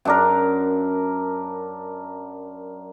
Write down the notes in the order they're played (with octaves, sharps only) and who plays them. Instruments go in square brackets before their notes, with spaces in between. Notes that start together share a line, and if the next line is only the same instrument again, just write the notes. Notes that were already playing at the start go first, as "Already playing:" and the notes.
[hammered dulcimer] F#2 D4 A#4